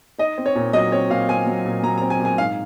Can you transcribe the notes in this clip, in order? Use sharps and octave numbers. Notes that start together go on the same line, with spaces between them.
D#4 D#5
C4
C#5
A#2
F#3 D#5
C4 C#5
A#2 F5
C4 G#5
F#3
A#2
F#3 A#5
A#5
C4
G#5
A#2
G#5
G#2 F5